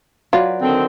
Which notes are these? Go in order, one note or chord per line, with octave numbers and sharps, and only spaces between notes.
F#3 F4 B4 D5
D3 D#3 C4